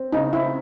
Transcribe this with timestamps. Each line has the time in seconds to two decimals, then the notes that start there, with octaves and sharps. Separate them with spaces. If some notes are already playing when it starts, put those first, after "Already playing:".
Already playing: C4
0.12 C#3 D#4
0.33 C4 E4